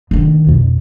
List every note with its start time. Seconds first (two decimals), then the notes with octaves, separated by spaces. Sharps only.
0.11 D3 D#3
0.47 F2 B2